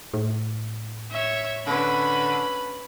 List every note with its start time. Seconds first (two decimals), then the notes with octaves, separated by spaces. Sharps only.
0.14 A2
1.11 C#5 E5
1.67 D3 C#4 B4 B5